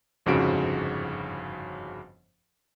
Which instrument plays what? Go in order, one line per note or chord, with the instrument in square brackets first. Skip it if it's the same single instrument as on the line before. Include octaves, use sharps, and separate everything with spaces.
[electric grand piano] G1 F2 G#2 C#3 F#4 D7